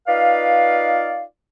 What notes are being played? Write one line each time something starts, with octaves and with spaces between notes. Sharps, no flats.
D#4 F4 B4 D5 F5